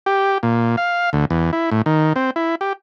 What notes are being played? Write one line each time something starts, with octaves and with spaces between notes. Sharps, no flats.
G4
A#2
F5
D2
E2
E4
A2
D#3
C4
E4
G4